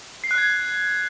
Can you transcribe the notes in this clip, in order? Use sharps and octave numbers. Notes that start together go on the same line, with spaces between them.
C7
F#6
G#6